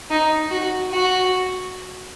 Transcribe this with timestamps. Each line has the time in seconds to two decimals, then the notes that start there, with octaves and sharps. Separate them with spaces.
0.10 D#4
0.51 F#4
0.90 F#4